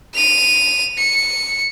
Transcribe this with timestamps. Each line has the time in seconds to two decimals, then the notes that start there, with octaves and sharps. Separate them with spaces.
0.15 D#7 F7
0.98 C#7